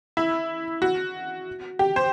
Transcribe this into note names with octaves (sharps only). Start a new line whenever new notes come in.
E4
F#4
G4
C5